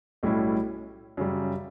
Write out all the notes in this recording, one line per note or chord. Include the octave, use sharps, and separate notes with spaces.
B1 A2 G3 C#4 E4
F#2 C#3 G3